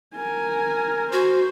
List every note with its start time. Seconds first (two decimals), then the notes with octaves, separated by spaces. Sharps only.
0.16 A#4 G#5
1.12 F#4 C5